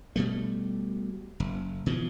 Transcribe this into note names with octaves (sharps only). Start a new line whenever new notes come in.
B2 G3 A3
F#1
B2 E3 F3